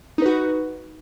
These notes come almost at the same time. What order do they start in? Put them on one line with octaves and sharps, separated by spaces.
D#4 B4 F#4